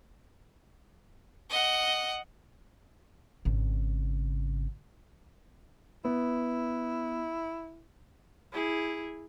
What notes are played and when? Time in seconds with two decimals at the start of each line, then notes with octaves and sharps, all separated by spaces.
1.50 D#5 F#5
3.45 G#1 C#3
6.05 B3 E4
8.52 E4 G#4